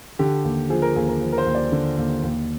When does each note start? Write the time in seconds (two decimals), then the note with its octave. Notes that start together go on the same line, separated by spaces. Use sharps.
0.19 D3 G4
0.44 D#2
0.70 F3 G#4
0.82 A#4
0.96 D#2 G#4
1.09 A#4
1.21 F3
1.32 A#4
1.38 C5
1.46 D#2
1.55 D5
1.72 D3
1.98 D#2
2.23 D#2